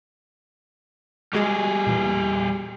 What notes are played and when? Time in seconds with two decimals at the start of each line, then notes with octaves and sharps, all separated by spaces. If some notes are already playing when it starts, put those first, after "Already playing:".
1.33 G3 G#3 F#4 G#4
1.87 E2 A#2